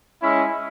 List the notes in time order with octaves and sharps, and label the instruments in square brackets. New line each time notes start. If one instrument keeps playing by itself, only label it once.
[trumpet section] G#3 C#4 E4